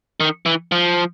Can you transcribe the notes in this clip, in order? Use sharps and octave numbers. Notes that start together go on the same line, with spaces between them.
D#3
E3
F3